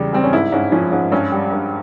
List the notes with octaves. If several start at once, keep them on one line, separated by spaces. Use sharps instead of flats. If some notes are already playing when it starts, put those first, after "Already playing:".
Already playing: E2 C#3 G3
G3 C4
C#4
G#2 E4
G#2 C#4
F3 C#4
G#2 C#4
G2 C#4
G3
G2